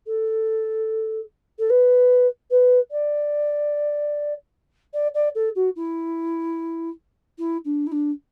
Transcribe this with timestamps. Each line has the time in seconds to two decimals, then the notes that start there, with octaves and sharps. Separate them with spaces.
0.07 A4
1.59 A4
1.70 B4
2.51 B4
2.91 D5
4.94 D5
5.14 D5
5.35 A4
5.55 F#4
5.76 E4
7.38 E4
7.65 D4
7.87 E4
7.92 D4